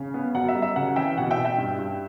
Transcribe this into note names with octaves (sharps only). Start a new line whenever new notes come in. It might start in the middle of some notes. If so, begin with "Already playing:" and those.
Already playing: C#3
B3
F#2 F#5
E5
G3
E5
C#3 F#5
E3 E5 G5
B2 F#5
E5 G5
B2
E5 G5
G2
G2